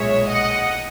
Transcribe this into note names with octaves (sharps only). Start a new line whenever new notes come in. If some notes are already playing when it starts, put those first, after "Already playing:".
Already playing: B1 A#2 G#3 C#5 E5
D#5 F#5